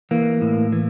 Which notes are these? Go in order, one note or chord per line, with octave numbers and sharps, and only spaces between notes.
E3 A#3
A2
E3